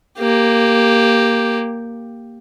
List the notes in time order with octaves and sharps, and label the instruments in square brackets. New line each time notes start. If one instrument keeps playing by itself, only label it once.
[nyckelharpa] A#3 G4